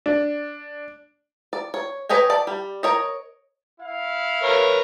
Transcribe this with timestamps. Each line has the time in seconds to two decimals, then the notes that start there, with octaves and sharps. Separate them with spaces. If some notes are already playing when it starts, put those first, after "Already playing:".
0.06 D4
1.53 D5
1.74 C#5
2.09 B4 C#5 D#5 G5 G#5
2.30 D5 A5
2.47 G3
2.83 A#4 C#5 D#5
3.81 E4 F5
4.43 A#4 B4 C#5